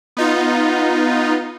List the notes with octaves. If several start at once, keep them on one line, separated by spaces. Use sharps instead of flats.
B3 D#4 F4